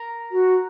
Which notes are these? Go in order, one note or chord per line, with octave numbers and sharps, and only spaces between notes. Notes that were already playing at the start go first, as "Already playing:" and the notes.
Already playing: A#4
F#4